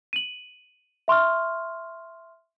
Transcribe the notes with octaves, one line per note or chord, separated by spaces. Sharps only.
D#7 F#7
E5 C6 C#6 F6